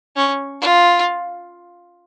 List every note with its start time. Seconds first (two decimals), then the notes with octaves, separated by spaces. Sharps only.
0.16 C#4
0.61 F4